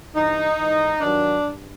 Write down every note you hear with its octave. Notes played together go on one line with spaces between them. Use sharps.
G2 E3 D#4
G#2 E3
G2 D#3 F#3 D4
G2